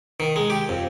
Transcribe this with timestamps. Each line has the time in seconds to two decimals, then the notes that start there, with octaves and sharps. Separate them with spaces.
0.20 D#3
0.36 G#3
0.50 G4
0.69 F2